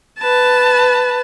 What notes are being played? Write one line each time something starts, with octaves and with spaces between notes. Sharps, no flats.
B4 A5